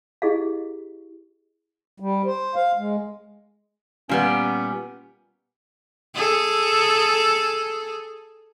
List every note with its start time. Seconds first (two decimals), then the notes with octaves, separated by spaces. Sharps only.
0.22 E4 G4 G#4 D#5 F5
2.00 G3
2.25 C5
2.55 F5
2.77 G#3
4.09 A#2 G3 B3 C#4
6.15 G#4 A4